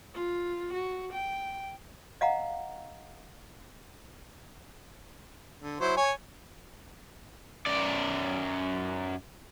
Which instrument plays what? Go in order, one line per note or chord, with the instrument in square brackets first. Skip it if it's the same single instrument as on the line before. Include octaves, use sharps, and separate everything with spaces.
[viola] F4
F#4
G5
[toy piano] D#5 F5 F#5 A#5
[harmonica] D3
F#3 E4 C5
C#5 G#5
[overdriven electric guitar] F#2 D5